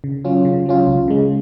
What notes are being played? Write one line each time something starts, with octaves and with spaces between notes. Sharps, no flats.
C#3
F#3 C#4 F4
C#3
F#3 C#4 F4
C#2
C#3 G#3